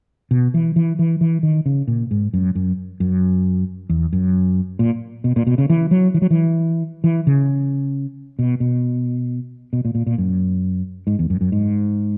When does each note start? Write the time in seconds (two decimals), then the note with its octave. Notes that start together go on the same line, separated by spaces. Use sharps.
0.31 B2
0.54 E3
0.76 E3
0.99 E3
1.21 E3
1.43 D#3
1.66 C#3
1.88 A#2
2.11 G#2
2.34 F#2
2.55 F#2
3.00 F#2
3.89 E2
4.13 F#2
4.79 A#2
5.24 B2
5.36 A#2
5.47 B2
5.58 C#3
5.70 E3
5.91 F#3
6.14 E3
6.22 F#3
6.30 E3
7.04 E3
7.27 C#3
8.39 B2
8.60 B2
9.73 B2
9.85 A#2
9.95 A#2
10.07 A#2
10.18 F#2
11.07 G#2
11.19 E2
11.30 F#2
11.41 F#2
11.52 G#2